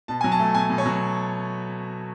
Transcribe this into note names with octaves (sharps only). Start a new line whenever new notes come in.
B2 A5
F#3 G#5
A5
A3
B2 G#5
B2
C#5
F#3